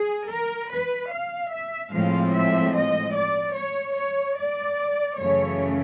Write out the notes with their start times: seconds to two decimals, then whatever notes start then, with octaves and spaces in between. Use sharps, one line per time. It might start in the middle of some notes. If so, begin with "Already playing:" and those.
Already playing: G#4
0.30 A#4
0.71 B4
1.11 F5
1.51 E5
1.93 A2 F3 G#3 C4 F5
2.33 E5
2.75 D#5
3.15 D5
3.55 C#5
3.96 C#5
4.38 D5
5.19 F#2 C#3 E3 A3 C#5